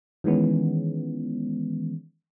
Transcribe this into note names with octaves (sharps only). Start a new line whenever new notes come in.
D#3 E3 G#3 B3 C#4